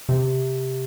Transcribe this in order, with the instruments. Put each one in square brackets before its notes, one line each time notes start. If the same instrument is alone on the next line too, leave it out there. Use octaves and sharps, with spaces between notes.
[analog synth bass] C3